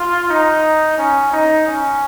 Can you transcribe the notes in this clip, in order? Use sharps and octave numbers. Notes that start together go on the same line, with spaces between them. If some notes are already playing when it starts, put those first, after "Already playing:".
Already playing: F4
D#4
C#4
D#4
C#4